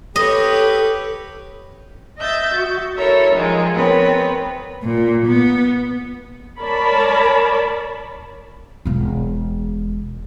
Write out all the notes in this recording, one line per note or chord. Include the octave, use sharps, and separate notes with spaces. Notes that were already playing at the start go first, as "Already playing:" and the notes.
G4 A4 B4 C#5 D#5
D#5 E5 G6 A6
F#4
E4 A4 A#4 C#5 E5
D#3 F3 G#3 D#4 F4
B3 C4 A#4 B4 C#5
A#2
B3
A#4 C#5 D5 A5 B5
E1 G#3